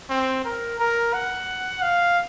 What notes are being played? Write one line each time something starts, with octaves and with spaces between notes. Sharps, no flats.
C4
A#4
A#4
F#5
F5